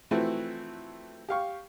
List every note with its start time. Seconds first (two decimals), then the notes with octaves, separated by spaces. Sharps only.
0.11 E3 F3 A3 C4 E4 F#4
1.29 G4 F5 C#6